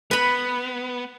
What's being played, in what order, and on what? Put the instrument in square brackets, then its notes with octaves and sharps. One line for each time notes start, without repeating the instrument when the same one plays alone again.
[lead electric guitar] B3 [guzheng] B4 B5